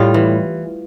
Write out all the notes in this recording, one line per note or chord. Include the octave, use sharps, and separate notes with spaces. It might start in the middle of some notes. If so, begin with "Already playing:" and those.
Already playing: A2 G3 F4
E3